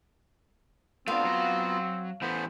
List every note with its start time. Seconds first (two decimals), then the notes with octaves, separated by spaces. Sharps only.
1.08 A3 B3 C4 D4 F4 F5
1.25 F#3 A#5
2.22 E3 A3 B3 C5 B5